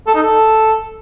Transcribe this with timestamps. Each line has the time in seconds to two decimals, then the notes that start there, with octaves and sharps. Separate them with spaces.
0.07 A4
0.14 D#4
0.22 A4